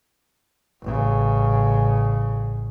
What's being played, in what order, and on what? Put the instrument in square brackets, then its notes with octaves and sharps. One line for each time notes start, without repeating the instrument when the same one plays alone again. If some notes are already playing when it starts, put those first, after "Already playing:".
[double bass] A1 C#3